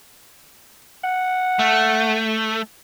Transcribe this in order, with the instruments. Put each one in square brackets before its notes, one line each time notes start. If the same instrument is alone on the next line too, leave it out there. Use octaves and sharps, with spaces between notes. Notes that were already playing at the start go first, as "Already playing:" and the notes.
[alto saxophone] F#5
[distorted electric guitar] A3